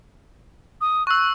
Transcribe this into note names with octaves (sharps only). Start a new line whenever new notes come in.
D#6
C#6 E6 F#6